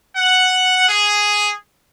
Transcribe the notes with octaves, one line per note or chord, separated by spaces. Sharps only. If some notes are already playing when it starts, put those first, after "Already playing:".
F#5
G#4